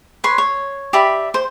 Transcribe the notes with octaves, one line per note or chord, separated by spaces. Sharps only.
B4 C#5 C6
C#5
G4 D5 E5 B5
C5